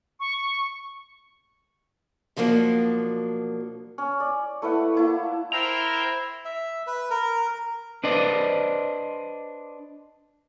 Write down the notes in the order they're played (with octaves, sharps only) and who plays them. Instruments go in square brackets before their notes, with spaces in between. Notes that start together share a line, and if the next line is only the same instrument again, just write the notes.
[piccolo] C#6
[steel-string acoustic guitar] B2 F3 F#3 A#3 D4
[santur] C#4
D5
A3 E4 B4 F#5
A#3 E4 A5
[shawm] E4 [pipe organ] A#4 C5 G5 [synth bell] F7
[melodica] E5
B4
A#4
[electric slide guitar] D4 B4 C5 D5 D#5